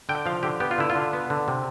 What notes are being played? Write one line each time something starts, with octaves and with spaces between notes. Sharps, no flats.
D3 G5
F3 F5
D3 G4
B3 G4
F4
D3 E4
F4
D3
B3
D3
C3